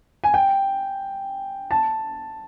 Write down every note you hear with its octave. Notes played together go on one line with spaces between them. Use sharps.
G#5
G5
A5